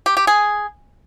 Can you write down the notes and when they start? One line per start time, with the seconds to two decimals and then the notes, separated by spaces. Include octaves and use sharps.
0.06 G4
0.17 G4
0.27 G#4